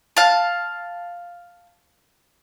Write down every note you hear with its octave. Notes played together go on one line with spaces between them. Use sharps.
F5 A5